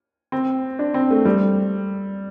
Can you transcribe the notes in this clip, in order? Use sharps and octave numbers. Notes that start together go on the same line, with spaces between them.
C4
D4
C4
A3
G3